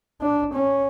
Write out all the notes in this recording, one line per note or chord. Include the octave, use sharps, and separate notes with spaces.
D4
C#4